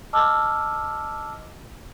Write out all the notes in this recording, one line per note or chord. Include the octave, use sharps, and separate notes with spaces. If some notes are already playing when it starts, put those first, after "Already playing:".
D#5 A5 D6 E6 F6